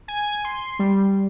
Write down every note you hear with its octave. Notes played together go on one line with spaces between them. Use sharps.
G#5
C6
G3